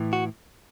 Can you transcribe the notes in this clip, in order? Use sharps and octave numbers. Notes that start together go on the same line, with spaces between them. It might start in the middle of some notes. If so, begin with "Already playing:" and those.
Already playing: A2 E3
F#4